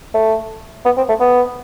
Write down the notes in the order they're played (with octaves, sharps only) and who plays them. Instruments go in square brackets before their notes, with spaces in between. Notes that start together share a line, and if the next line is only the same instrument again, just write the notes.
[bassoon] A3
B3
C4
A3
B3